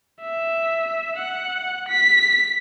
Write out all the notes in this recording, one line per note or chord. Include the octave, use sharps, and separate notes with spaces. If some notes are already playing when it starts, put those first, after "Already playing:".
E5
F#5
B6